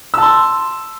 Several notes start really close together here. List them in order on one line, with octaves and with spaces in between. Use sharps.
E6 A5 C6